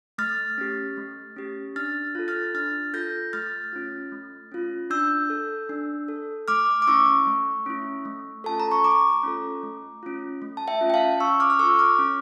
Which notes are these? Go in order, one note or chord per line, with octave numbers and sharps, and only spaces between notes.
A3 F6 A6
C#4 G4
A3
C#4 G4
D4 F6 A6
F4 A4
F6 A6
D4 F6 A6
F4 A4 G6 A#6
A3 F6 A6
C#4 F4
A3
C#4 F4
D4 E6 G6
A4
D4
A4
A3 D6 F6
D6
C#4 E4 C#6 E6
A3
C#4 E4
A3
C#4 F4 A4 A5
A#5
C#6
A3 A#5 D6
C#4 F4 A4
A3
C#4 F4
A3
A5
E5 G5
C#4 F4
G5
F5 A5
C#4 C#6 E6
D6 F6
F6
F4 A4 C#6 E6
D6 F6
C#4